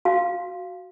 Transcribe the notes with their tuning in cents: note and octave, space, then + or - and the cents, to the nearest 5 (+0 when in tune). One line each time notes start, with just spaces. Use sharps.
F#4 +0 F5 -10